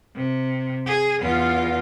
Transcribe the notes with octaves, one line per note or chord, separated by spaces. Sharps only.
C3
G#4
E2 F4